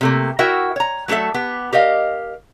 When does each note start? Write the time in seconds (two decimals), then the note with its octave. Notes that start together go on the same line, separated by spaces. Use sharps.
0.01 C3 A3 A#3
0.39 E4 F#4 A#4 E5 F#5 G5
0.76 C#5 A#5
1.08 F#3 A3 F#4 A4 E5
1.34 B3 G4
1.73 G4 A#4 D#5 F5